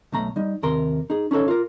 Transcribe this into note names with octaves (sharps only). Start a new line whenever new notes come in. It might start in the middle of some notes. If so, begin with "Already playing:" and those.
B1 A3 A#5
G3 D#4
D#2 C3 A#4 C6
D#4 G#4
C#4 D#4 G#4 A4 C#5
F4 A#4